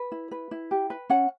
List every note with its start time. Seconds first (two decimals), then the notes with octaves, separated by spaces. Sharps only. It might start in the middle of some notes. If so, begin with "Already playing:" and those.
Already playing: B4
0.12 E4
0.31 B4
0.51 E4
0.71 G4
0.90 B4
1.10 C#4 F#5